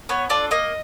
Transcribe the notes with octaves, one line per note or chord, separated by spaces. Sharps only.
B3 C#5
D4 F4 A4 D5
A#3 D#5